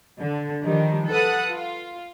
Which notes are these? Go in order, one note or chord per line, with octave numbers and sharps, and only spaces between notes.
D3
D#3 F3 G3 D4
A4 B4 F#5 D#6 F#6
F4